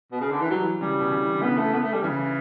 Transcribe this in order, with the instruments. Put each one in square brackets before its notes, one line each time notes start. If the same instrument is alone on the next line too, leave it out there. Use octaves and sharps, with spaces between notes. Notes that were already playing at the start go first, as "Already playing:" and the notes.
[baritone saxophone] B2
C#3
D3
E3
[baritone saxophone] F#3 [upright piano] G3
[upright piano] E3
[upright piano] C#3 [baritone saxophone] G3
[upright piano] B2
C#3
E3
D3
[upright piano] C#3 [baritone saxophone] B3
[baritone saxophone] A3
B3
A3
G3
[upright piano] C#3 [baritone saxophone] E3